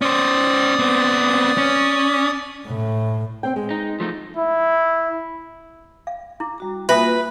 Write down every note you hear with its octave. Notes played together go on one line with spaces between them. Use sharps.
C#4 C5 D5 D#6
B3 C4
C#4
A2
C4 G5
G#3
D#4
F3 A3 D#4
E4
F5
E4 D6
G3 F#4 A#5
A#3 F4 F#4 B4 E5 G#5 D#6